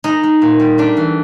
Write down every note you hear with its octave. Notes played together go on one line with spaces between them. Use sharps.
G#3 D#4
G#3
A#2
G3
A3 D4
E3